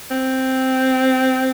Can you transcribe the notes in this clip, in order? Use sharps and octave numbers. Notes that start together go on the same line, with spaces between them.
C4